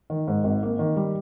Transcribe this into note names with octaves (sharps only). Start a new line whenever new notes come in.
D#3
G#2
G#1
A#3
D#3
G3